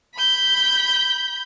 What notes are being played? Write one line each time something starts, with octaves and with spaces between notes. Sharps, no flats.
B5 G6